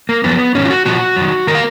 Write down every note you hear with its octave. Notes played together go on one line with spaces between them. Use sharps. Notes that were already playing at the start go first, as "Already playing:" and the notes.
A#3
F#2 F3 B3
G#2 D#3 C#4
F4
F#4
A#2 F3 F#4
F#2 D#3
D#3 A#4
F5